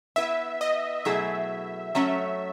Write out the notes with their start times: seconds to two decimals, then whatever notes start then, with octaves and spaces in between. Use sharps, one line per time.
0.16 B3 E4 B4 E5
0.61 D#5
1.05 B2 F#3 A3 E4 G#4 E5
1.95 F#3 A3 C#4 E5